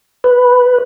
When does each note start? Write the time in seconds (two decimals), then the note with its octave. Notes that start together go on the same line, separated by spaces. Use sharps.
0.24 B4